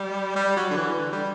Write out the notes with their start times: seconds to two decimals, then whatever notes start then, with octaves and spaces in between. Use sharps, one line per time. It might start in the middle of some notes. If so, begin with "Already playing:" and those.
Already playing: G3
0.35 G3
0.56 F#3
0.70 D3
0.77 E3
0.97 D3
1.12 G3